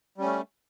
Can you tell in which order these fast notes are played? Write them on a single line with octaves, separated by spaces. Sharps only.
G3 C#4 A3